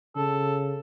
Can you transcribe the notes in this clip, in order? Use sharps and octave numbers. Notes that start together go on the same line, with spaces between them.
C#3 A4